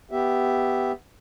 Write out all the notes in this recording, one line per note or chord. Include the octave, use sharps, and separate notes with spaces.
B3 G4 E5